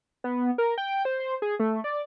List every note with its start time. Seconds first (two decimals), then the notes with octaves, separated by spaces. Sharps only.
0.24 B3
0.58 A#4
0.78 G5
1.05 C5
1.20 C5
1.42 G#4
1.60 A3
1.84 D5